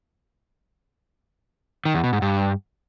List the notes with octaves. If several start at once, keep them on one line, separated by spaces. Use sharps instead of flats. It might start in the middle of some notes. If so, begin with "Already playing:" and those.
D#3
E2
B2
G#2
G2